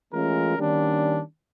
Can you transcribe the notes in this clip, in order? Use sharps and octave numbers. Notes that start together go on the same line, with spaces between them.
E3 G#3 A3 C#4 F4 A#4
D#3 G3 A#3 C#4 D4